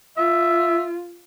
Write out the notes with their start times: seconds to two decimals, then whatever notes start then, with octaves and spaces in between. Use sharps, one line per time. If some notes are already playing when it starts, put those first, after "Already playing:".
0.17 F4 E5